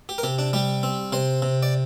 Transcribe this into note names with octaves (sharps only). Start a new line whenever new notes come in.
G4
A#4
C3 G4
D4
G3 G4
C4
C3 C5
C3
D5